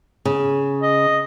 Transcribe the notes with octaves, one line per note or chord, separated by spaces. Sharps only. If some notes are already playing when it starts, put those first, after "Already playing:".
C#3
D#5